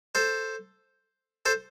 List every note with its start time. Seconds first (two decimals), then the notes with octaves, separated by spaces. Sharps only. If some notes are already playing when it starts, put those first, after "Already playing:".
0.15 A4 C5
1.46 A4 C5